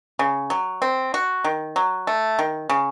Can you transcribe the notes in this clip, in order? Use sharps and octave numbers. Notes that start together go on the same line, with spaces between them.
C#3
F#3
C4
F#4
D#3
F#3
A3
D#3
C#3